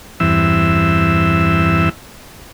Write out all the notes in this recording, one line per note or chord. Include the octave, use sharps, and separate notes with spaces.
E2 G2 E3 C4 E5 E6